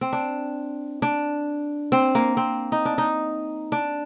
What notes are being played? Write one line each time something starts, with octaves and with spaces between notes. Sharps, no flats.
C4
D4
D4
C4
A#3
C4
D#4
D4
D#4
D4